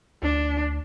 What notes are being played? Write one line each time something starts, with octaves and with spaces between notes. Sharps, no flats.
D2 D4